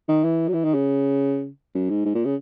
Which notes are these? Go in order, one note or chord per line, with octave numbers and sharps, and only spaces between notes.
D#3
E3
F#3
E3
D#3
C#3
F#2
G#2
G#2
A#2
C#3